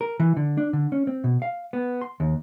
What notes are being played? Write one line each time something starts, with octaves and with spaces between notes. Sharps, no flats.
A#4
E3
D3
D4
D3
C#4
C4
B2
F5
B3
C6
D#2